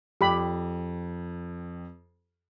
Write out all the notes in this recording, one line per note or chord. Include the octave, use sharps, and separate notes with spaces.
F2 G4 B5